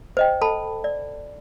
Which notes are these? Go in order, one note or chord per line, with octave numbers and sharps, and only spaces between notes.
C5 D#5 G5
A4 A5 B5
D5